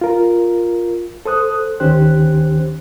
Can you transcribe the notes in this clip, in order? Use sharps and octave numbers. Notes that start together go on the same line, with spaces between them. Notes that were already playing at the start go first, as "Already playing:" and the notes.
F4 A#4
A4 C5 D#6 F#6
D2 D#3 C#4 G4 C5 F#6